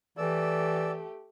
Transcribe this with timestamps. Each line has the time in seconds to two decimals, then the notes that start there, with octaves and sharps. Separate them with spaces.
0.18 E3 A3 G4 D5 E6